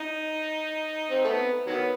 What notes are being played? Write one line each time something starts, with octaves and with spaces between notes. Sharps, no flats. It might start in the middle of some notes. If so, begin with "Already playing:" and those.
Already playing: D#4
C4
A3
B3
D#3 F#3 B3